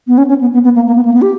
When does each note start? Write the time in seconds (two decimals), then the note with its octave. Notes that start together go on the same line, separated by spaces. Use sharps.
0.07 B3
0.18 C#4
0.29 C#4
0.41 B3
0.53 B3
0.64 B3
0.75 A#3
0.87 A#3
0.96 B3
1.05 A#3
1.14 B3
1.22 G4